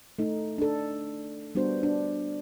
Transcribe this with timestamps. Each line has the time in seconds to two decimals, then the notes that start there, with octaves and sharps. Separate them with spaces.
0.19 A3 D#4
0.58 D4 A4
1.55 G3 B3 D4 F#4 C5
1.83 D4